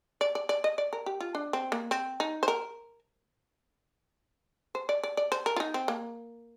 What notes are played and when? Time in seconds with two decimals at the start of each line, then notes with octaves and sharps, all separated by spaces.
0.21 D5
0.35 D5
0.49 D5
0.64 D#5
0.78 D5
0.93 A#4
1.06 G4
1.20 F4
1.35 D4
1.53 C4
1.72 A#3
1.91 C4
2.20 D#4
2.43 C5
2.48 A#4
4.75 C5
4.89 D5
5.03 D5
5.17 D5
5.32 C5
5.46 A#4
5.56 F4
5.60 D#4
5.74 C4
5.88 A#3